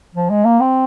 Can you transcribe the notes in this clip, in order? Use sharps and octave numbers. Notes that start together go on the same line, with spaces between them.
F3
G#3
A#3
C4